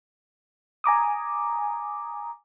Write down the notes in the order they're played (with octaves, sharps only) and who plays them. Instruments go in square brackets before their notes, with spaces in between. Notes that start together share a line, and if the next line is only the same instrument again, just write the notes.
[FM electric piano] G#5 A#5 D6 D#6